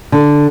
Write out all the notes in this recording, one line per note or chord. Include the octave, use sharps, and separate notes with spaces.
D3